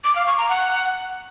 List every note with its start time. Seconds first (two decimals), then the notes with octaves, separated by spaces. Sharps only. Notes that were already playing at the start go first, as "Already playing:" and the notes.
0.04 D6
0.15 F5
0.27 C#6
0.38 A#5
0.49 F#5